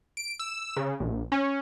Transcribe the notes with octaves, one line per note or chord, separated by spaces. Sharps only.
D7
E6
C#3
A#1
C#4